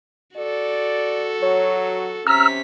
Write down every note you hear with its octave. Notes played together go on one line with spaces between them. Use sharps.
F#4 A4 D5
F#3 C#5
C3 C#4 A#5 E6 F6 B6